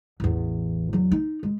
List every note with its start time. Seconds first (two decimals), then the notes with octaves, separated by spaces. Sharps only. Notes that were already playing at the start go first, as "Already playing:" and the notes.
0.20 A1 E2
0.93 E2 F#3
1.12 D#4
1.43 G#3